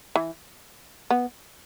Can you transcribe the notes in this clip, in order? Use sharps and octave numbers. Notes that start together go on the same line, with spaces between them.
E3
B3